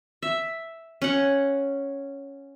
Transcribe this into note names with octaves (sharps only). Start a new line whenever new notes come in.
E5
C#4 F#5